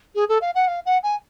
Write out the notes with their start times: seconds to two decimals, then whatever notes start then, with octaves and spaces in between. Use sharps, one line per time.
0.15 G#4
0.29 A4
0.41 F5
0.55 F#5
0.67 F5
0.85 F#5
1.03 G#5